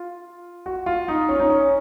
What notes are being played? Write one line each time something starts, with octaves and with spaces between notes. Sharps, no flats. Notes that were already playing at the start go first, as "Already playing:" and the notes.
Already playing: F4
F#4
F4
D#4
C#4
D#4
C#4